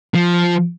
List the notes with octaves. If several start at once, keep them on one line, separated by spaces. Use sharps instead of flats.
F3